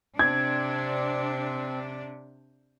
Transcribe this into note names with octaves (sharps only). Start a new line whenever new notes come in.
C3 C4 D4 G#6